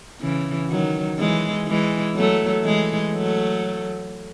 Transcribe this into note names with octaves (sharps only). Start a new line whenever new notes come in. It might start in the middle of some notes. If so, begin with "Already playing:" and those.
C#3 E3
D#3 F#3
E3 G#3
E3 G#3
F#3 A3
E3 G#3
F#3 A3